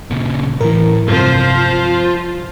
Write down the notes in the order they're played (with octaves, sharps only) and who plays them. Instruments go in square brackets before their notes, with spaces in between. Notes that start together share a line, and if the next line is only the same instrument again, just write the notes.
[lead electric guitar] A#2 C#3
[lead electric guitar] A2 [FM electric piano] E3 A#4
[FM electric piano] G2 C3 [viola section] F3 C5 [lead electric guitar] F4